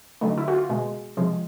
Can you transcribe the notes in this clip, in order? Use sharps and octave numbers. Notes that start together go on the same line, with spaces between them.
D3 F#3 A3 D#4
E4
F#4
F4
B2 G#3
C3 F3 G#3